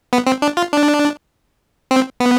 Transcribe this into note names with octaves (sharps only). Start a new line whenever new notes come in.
B3
C4
D4
F4
D4
C4
B3